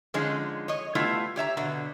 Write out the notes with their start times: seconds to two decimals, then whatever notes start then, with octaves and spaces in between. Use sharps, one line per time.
0.14 D3 F3 G#3 C#4 D#4
0.68 C#5 D#5
0.95 G3 A3 B3 E4 F4
1.36 G4 C#5 E5 A#5
1.57 B2 D3 B3